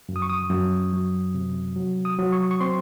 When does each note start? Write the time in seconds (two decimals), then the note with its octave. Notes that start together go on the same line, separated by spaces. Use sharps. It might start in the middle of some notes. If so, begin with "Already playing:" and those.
0.09 F#2
0.16 D#6
0.22 C#6
0.30 D#6
0.50 F#2
0.93 F#3
1.34 C3
1.76 F#3
2.05 D#6
2.18 F#3
2.32 C#6
2.51 C#6
2.61 C4 C6